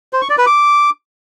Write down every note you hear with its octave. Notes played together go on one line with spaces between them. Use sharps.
C5
C#6
D5
B4
D6